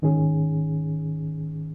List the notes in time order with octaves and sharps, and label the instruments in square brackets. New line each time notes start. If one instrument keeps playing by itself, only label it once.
[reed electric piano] G#2 D#3 C#4 G#4